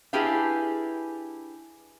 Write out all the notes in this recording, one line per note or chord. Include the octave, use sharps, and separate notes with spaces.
D4 E4 G4 G#4 B4 F5